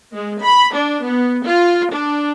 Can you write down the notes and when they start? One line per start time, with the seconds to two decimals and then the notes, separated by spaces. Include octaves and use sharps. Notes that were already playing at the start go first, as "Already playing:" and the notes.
0.13 G#3
0.42 B5
0.73 D4
1.04 B3
1.46 F4
1.92 D4